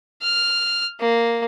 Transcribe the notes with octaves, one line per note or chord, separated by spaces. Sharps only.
F6
A#3